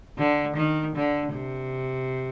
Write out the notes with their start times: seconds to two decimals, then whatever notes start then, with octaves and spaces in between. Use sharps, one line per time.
0.18 D3
0.57 D#3
0.96 D3
1.35 C3